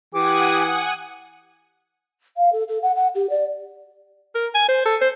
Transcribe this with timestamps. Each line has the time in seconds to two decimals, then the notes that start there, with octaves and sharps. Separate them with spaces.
0.15 E3 G4 F#5 G#5 D6 D#6
2.37 F5
2.53 A4
2.68 A4
2.83 F#5
2.96 F#5
3.15 G4
3.30 D5
4.35 A#4
4.55 G#5
4.68 C5
4.85 A4
5.01 C5